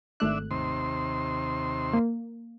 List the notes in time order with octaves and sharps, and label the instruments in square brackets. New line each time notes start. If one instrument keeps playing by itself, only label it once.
[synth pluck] G#1 A3 F#6 [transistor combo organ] D4 E5
[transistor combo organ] D#2 C3 C6
[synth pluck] A#3